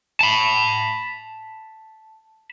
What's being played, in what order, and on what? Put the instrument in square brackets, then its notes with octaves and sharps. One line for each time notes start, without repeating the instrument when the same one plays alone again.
[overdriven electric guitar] A5 B5